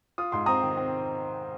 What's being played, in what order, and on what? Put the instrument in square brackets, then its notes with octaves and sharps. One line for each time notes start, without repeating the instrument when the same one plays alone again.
[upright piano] F4 [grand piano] D#6
[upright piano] G#2 [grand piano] C6
[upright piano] C4 [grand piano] A#5 D#6
[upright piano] D#3
C4